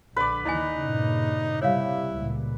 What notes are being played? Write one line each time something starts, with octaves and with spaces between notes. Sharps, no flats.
A#1 D3 B4 D5
D#2 D#3 D#4 E4 D#5 G#5
G2 A#2 C#3
C3 G3 E4 C#5 F5
C#2 A#2